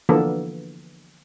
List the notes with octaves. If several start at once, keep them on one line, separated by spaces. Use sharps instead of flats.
D3 E3 F3 A#3 B3 A4